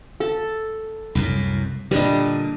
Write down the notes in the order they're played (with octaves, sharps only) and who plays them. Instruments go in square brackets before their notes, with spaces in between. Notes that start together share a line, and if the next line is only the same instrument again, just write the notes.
[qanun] A4
[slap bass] C2 F#2 A2
[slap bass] A#2 D3 [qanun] G3 D4 D#5